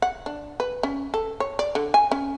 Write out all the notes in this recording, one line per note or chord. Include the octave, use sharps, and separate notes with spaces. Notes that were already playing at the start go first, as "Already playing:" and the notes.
F#5
D4
B4
C#4
A4
C#5
D5
D3
G#5
C#4